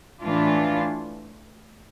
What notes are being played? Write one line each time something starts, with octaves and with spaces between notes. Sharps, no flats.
A2 E3 A3 D4 F4